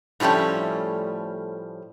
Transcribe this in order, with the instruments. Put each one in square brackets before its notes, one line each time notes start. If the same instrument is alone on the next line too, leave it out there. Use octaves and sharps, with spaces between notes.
[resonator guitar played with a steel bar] A2 F3 G3 A3 C#4